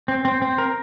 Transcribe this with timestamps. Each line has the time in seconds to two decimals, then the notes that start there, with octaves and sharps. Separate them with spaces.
0.08 C4
0.25 C4
0.42 C4
0.58 A#4